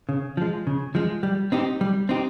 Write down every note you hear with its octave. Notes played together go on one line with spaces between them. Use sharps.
C#3
F3 G#3
C#3
F3 G#3
G3
C4 D#4 G4
G3
C4 D#4 G4